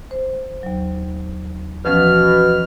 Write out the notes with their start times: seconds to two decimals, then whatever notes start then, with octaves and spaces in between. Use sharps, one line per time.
0.11 C5
0.63 D#2 F#3
1.85 B2 E3 F3 C#4 F6